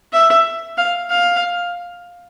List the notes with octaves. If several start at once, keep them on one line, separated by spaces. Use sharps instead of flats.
E5
F5
F5